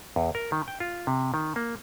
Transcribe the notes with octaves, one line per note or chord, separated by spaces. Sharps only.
E2
A#4
D#3
G5
F4
C3
D#3
A#3